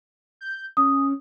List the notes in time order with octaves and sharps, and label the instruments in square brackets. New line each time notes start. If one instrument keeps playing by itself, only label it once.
[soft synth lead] G6
[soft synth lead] C#4 [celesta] D#6